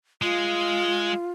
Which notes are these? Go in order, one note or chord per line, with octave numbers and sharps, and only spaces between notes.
G#3 F4